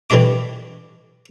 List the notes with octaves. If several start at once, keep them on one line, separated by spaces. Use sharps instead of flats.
D3 E3 G3 D4 D#5 D6